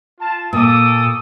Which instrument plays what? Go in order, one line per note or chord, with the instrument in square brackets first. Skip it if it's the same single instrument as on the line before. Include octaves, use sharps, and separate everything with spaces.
[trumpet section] F4 A5
[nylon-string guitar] A#2 [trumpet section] A4 D6 D#6